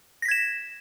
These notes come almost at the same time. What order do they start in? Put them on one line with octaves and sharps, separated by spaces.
A#6 B6 G#6 E7